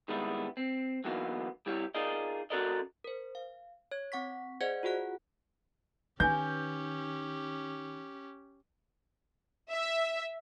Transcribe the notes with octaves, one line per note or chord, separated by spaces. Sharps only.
D#3 G3 G#3 B3 E4
C4
D3 E3 F#3 A#3 B3 D#4
G3 E4 G4 C#5
D#4 F4 G#4 A#4 D5 D#5
C#4 F#4 A4 A#4 D5 D#5
A#4 C5
F5
C#5 G#6
C4 F#5 C#6 B6
G#4 C5 D5 D#5 F#5 G#6
F4 F#4 G#4 F#5 F#6
D#3 C#4 G4 B4 F5 G#5 G6
E5